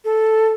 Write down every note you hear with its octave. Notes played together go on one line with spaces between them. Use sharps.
A4